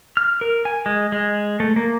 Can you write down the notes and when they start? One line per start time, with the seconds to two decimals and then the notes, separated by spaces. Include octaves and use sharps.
0.17 F6
0.41 A#4
0.65 G#5
0.86 G#3
1.12 G#3
1.60 A3
1.76 A#3